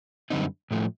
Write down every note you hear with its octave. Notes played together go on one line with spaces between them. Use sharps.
F#2 D3 G3 C4 D#4
A2 F3 A3